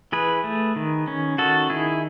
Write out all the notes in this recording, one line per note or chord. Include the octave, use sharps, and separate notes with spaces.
E3 G#4 B4
A3
D#3
C#4
D#3 F#4 A4
D#3 E4 G#4